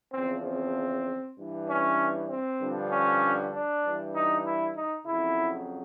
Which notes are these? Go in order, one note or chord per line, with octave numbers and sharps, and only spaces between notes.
E2 C#3 F3 C4
C4
G2 E3
C#4
C4
G2 D3 F3
C#4
D4
G2 E3
D#4
E4
D#4
F2 C#3 F#3 E4